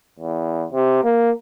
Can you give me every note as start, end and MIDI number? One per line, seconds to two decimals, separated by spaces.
0.20 0.66 40
0.73 1.03 48
1.04 1.31 58